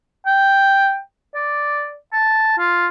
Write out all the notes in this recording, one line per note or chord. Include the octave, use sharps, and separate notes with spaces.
G5
D5
A5
F4